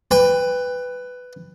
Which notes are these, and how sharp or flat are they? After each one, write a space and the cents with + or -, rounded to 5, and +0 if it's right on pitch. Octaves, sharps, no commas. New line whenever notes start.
B4 +10 G5 +30